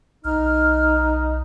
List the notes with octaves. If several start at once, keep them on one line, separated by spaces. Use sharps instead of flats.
B1 D#4 F6